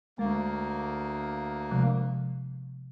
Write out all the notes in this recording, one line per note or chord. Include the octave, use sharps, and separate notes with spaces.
D2 G#3 A#3
C3 F3 G#3